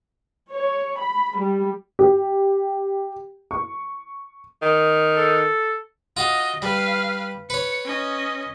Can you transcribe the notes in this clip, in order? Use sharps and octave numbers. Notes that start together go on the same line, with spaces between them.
C#5
B5
G3
G4
C#6
D#3
A4
F4 F#4 D#5 F5
G3 B4 F5
B4 C#5 C#7
C#4 D#5